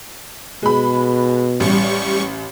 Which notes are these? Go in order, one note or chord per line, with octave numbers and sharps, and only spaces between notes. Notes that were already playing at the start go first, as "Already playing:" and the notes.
B2 G#3 B5
A1 G3 C#6